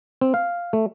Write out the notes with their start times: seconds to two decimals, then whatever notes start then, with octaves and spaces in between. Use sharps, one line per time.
0.21 C4
0.34 F5
0.73 A3